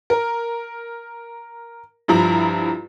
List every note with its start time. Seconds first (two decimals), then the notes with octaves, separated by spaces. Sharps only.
0.10 A#4
2.08 G2 F3 E4 A#5